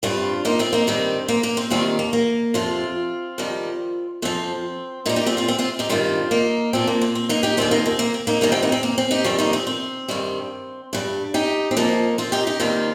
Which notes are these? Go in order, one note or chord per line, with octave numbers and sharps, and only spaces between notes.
G2 G3 C4 F4
A#3 D#4
C4 F4
A#3 D#4
G2 D#3 G3 C4
A#3
A#3
C4
D#2 D#3 G3 C4 F4
A#3
A#3
F2 C3 F3 C4 F4
F2 D#3 G3
F2 F3 C4
A#2 G3 A#3 D#4
D#4 G4
C4 F4
C4 F4
C4
C4 F4
D#4 G4
G2 D#3 G3 C4 F4
A#3 D#4
A#2 F3 C4
A#3
C4
C4
A#3 D#4
D#4 G4
D#2 D#3 G3 C4 F4
A#3 D#4
C4
A#3
C4
A#3 D#4
G2 D#3 G3 A#3 D#4
C4 F4
A#3 D#4
C4
A#3
C4
D#4 G4
F2 D#3 G3 C4 F4
A#3 D#4
C4
C4
G2 D#3 G3
G2 G3
D#4 G4
C4
F2 F3 A#3 D#4
C4 F4
D#4 G4
D#4 G4
D#2 D#3 G3 C4 F4